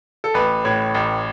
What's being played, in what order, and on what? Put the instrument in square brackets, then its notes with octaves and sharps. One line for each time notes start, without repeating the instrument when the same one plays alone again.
[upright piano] A4
[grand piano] A1 [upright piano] B4
[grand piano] A2 [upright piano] C#5
[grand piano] A1